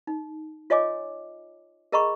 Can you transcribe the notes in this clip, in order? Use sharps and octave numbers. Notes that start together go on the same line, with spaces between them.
D#4
F4 C#5 D#5 G#5 D6
G#4 A#4 D#5 A#5 B5 C#6